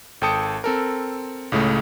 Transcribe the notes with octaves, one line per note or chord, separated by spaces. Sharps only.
G#1 A4 G5 A5 D#6 C#7
C4 A4 A#4
C#2 A2 C#3 A3